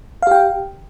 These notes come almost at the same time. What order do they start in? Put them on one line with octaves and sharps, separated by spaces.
F5 G4 G5